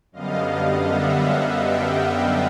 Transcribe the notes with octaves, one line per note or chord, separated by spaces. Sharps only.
F#2 D3 G3 B3 D#5 F5
E5 F#5
F5 G5